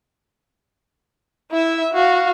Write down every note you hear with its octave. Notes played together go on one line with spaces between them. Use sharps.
E4 E5
F#4 F5